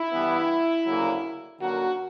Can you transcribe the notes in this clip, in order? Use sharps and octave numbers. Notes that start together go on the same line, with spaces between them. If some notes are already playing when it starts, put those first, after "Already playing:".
Already playing: E4
G2 E3 B3
D2 C#3 F#3 A#3
F#2 D3 F#3 A#3 F#4